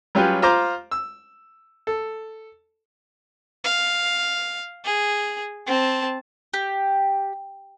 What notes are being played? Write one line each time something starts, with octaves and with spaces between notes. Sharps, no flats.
F#3 G3 C#4 F4 G4 B4
F4 C5 A#5 D6
E6
A4
F5
G#4
C4 A5
G4